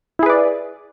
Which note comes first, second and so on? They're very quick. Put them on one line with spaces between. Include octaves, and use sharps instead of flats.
E4 G#4 B4 D5